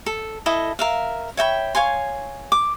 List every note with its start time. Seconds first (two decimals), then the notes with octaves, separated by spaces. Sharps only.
0.06 A4
0.46 E4 A4 D#5
0.79 A#4 E5 F5
1.37 C#5 E5 G5 B5
1.75 C#5 F5 G#5 C6
2.52 D6